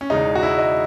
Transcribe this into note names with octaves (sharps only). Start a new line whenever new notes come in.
C#4
E1 E2 C#3 G#3 D#4
F#4
E4
D#5